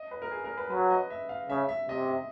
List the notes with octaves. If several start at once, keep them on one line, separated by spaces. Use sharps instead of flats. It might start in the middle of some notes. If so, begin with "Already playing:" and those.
Already playing: D#5
B4
A#4
G#4
A#4
B4
F#3 B4
D#5
E5
F5
C#3 E5
E5
C3 D#5
E5